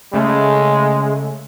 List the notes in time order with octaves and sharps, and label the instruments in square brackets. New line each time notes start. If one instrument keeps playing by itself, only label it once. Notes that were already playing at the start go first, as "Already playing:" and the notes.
[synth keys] C#3 A3 [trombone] G#3